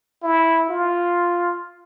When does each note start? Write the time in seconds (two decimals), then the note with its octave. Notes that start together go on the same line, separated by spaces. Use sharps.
0.23 E4
0.69 F4